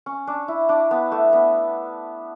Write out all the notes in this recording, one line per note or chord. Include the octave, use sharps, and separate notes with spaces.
C#4
D4
E4
D4
B3
A3
B3